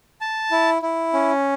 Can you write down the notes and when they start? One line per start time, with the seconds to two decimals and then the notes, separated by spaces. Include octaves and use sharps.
0.21 A5
0.51 E4
0.82 E4
1.13 C#4